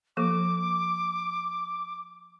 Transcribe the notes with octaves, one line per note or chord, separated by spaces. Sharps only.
F3 A#3 A4 D6